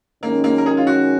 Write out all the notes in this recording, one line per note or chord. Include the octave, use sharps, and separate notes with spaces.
F#2 D#3 G#3 A#3 C#4
A#3
A#4
G#4
F4
F#4